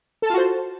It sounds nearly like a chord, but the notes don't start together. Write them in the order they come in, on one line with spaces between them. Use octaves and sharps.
A4 A5 F4 F#4 C5